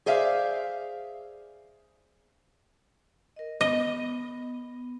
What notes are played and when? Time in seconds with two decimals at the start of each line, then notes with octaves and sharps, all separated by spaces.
0.06 G#4 C5 D5 E5 F5
3.36 A#4 D#5
3.61 B3 D#5